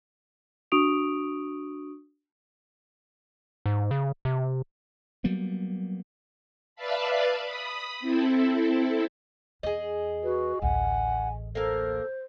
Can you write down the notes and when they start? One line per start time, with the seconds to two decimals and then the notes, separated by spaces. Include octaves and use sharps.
0.72 D4 F#4 C#6 D#6 D7 F7
3.66 G#2
3.91 C#3
4.25 C3
5.24 F#3 G3 A#3 B3
6.75 B4 D5 E5 F5 A5 B5
7.43 B5 D#6
8.00 C4 E4 A4
9.63 E2 G#4 D#5
10.23 F#4 B4
10.62 A1 D2 F#5 G#5
11.55 A#3 A4 A#4 C5